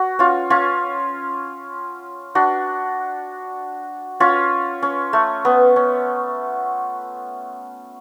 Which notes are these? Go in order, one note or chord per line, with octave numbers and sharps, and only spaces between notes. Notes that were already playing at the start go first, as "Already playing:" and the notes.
Already playing: F#4
C#4 F4
C#4 F4
D4 F#4
C#4 F4
C#4
A3
B3
C#4